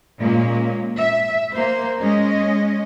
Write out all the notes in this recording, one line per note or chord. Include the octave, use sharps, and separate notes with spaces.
A#2 G#3 A#3 C#4
E5
A#3 C5
G#3 C#4 D#5